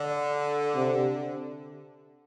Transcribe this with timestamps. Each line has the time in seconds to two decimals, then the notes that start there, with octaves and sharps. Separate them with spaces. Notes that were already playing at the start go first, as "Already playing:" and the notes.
Already playing: D3
0.75 C3